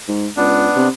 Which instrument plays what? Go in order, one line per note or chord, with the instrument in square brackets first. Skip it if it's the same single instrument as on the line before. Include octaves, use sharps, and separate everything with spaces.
[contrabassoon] G#2
[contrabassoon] C#2 [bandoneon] B3 D4
[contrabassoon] C3